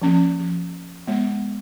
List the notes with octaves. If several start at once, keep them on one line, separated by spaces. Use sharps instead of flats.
F3 A#3 C#4
F3
G#3 B3